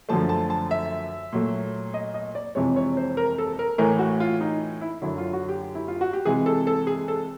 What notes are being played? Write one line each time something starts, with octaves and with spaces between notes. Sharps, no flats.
F#2 D3 F3 A3 A5
A5
A5
E5
A#2 F#3 A3
D#5
D#5
D5
F2 C3 E3 G#3 C#5
C#5
C5
A#4
A4
A#4
A2 E3 A3 A#4
F#4
F4
D#4
E4
F#2 D3 F#3 E4
F4
F#4
G4
E4
F4
F#4
G4
C3 E3 G#3 G#4
A4
A4
G#4
A4